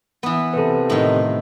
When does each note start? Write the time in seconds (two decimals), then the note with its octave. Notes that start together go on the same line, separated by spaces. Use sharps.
0.23 E3 B3
0.53 C3 A4 B4
0.90 A2 D#3